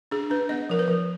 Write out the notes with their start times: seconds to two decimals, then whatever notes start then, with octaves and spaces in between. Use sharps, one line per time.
0.11 D4 G#4
0.30 D4 B4
0.49 B3 D#5
0.70 F3 A#4
0.79 B4
0.88 F3